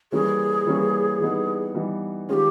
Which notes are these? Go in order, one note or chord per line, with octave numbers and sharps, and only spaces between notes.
E3 G3 A#3 C#4 G#4
E3 G3 A#3 C#4
E3 G3 B3 D#4
E3 G3 B3 D#4
D#3 G#3 C#4 F4 G4 G#4